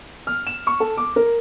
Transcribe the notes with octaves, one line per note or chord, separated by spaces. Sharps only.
F6
E7
C#6
A4
D6
A#4